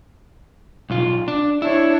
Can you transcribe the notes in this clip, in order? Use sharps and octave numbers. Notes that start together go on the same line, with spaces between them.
B1 F4
D4
D4 E4 C#5